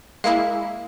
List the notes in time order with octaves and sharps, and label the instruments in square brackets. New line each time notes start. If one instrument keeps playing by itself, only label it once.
[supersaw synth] G#3 A#3 E4 [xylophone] F5